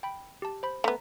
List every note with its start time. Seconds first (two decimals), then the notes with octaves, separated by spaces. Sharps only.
0.03 G5 B5
0.42 G4 A5
0.63 C5 B5
0.84 A3 B3 A#5 B6